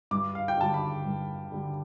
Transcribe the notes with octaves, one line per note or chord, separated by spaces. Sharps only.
G2 D6
F5
G5
D3 G3 A5
B5
G2
D3 G3